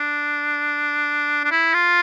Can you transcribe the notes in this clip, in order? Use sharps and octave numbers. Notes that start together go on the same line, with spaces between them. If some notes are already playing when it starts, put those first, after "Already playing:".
Already playing: D4
D4
E4
F4